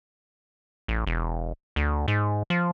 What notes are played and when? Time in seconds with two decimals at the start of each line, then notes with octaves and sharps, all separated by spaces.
0.88 A1
1.07 E1
1.76 D2
2.08 G#2
2.50 F3